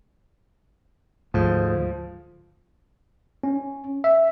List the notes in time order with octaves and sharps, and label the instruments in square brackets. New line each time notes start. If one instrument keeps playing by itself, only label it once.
[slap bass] D2 G#2 [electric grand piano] F3
[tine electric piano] C#4
E5